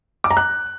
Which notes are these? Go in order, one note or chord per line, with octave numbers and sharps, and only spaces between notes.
D6
A#5
F#6